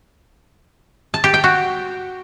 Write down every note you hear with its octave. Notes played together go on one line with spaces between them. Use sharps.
A5
G4
G5
F#4